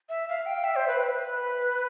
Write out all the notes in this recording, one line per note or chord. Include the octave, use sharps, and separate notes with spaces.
E5
F5
G5
E5
C5
B4
B4
B4